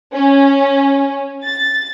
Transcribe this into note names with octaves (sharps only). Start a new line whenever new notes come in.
C#4
A6